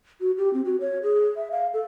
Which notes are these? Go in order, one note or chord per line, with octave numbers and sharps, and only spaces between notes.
F#4
G4
C4
F#4
C#5
G#4
E5
F5
A4